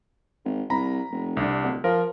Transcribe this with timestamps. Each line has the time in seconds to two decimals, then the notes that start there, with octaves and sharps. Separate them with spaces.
0.45 G#1
0.70 C2 A#5 B5
1.11 F1
1.37 C2 D4
1.64 D1
1.84 F3 A#4